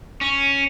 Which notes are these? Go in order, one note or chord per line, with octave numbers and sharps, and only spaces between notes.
C#4